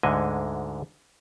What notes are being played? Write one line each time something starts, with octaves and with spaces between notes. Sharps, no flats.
D2 G#2 D3 G#3 D#5 G#5